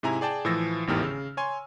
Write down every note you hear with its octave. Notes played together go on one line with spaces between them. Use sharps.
G#2 C3 E4 G#5 A#5
G#4 D5 G5 A5
A2 E3 F3 E6 A6 A#6
G#1 E2 A2 D#3 G4 F6
C#3 E6
C#5 G#5 C6